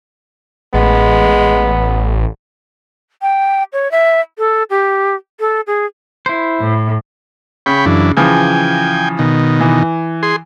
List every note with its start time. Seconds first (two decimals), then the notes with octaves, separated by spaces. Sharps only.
0.74 A1 G#3 B3
3.22 G5
3.73 C#5
3.91 E5
4.38 A4
4.70 G4
5.40 A4
5.67 G#4
6.26 E4 C5
6.61 A2
7.66 C#3 C#5 G5 B5
7.86 F#2 E3 D4
8.17 C#3 E3 F3 G5 G#5
9.19 B2 D#3
9.61 E3
10.23 G#4 C6